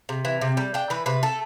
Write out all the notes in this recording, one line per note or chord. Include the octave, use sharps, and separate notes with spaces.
C3
E3
C3
G3
D4 G5
E3 B4
C3 B4
A3 A4